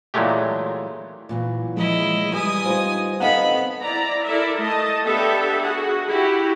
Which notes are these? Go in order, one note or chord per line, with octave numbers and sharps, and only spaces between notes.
A#2 E3 F#3 G#3 A3 G4
A#2 E3 F#3
F3 G#3 E4 D#5
G3 B4 E5 G#5 D#6
D#4 F4 C5
B3 C4 D#4 A4 D#5 F5 F#5 B5
E4 D5 A#5
E4 A4 A#4 D5 E5
A3 D#5 A5
B3 D4 G4 A4 E5
F#4 G#4 F#5
E4 F#4 G4